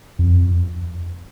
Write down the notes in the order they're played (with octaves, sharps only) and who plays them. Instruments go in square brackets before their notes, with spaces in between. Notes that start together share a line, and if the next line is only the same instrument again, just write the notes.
[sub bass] F2